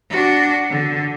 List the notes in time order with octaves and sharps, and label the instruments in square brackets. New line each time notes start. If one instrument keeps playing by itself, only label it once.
[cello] D4 F#4
D3